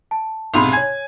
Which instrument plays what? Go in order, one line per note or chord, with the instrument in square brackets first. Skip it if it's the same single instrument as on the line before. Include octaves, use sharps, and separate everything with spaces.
[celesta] A5
[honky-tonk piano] B1 G#2 C3 [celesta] B5 C6 F7
[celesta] C#5 G#6 [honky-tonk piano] G#5